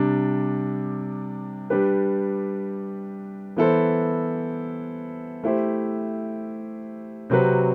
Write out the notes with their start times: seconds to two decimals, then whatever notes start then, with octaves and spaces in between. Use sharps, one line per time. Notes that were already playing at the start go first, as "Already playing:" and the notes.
Already playing: C3 G3 D4
1.70 G3 D4 G4 B4
3.56 E3 B3 E4 A4 C5
5.44 A3 E4 G4 C5
7.30 C3 F#3 C4 F#4 B4